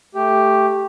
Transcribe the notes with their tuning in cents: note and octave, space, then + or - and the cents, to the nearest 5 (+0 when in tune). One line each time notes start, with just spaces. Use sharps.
A3 +0 G4 +0